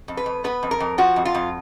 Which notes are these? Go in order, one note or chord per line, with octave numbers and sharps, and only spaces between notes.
F2
B4
F2
B3 B4
F2
A#4
F2
F3 F#4
F2
F4
F2